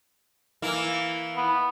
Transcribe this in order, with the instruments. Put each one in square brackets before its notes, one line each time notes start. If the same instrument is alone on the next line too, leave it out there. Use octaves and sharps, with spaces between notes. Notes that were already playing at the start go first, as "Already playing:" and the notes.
[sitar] E3 A#3 E4
[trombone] B3